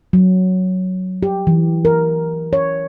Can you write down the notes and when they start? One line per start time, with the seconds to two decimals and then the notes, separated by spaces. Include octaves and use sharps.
0.13 F#3
1.23 G4
1.47 E3
1.85 A#4
2.53 C#5